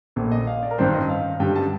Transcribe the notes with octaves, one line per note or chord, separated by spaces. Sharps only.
A#1 A#2 A3
D#5
F5
D5
A#4
A1 G2 D#3 G3 C4 C5
D#5
F5
G2 D3 G3 G5
A5